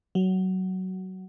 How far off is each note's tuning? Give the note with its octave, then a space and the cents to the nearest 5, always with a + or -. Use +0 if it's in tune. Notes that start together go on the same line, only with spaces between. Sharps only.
F#3 +15